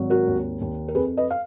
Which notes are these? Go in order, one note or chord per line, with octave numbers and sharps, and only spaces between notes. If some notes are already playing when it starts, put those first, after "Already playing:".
Already playing: G#1 F#3
F#4 A#4
D#2
D#2
A#4
F2 G#4 B4
B4 D#5
F5